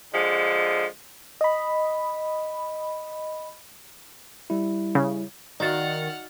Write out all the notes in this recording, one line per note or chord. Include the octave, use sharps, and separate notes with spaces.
D3 F3 G#3
D#5 B5
G3 E4
C#3
D#3 D#4 F#4 D5 F5 F#5 F6 A6